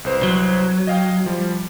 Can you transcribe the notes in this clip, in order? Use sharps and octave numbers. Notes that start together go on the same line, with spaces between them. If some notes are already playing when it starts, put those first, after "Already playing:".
C2 B4 C5
F#3
D#5 F5 G5
F3 G3